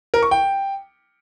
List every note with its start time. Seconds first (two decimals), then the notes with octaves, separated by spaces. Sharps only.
0.14 A#4
0.23 C#6
0.31 G5